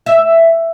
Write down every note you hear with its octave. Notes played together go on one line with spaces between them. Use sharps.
E5